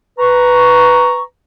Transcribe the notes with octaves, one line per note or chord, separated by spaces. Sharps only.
B4 A#5 C#6